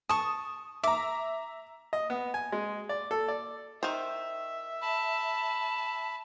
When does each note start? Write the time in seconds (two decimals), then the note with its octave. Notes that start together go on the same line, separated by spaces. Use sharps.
0.09 A5 C#6 D#6
0.84 E5 A#5 D6
1.93 D#5
2.10 B3
2.34 G#5
2.52 G#3
2.89 D5
3.11 A4
3.28 D5
3.83 D#3 C5 E5
4.82 A5 B5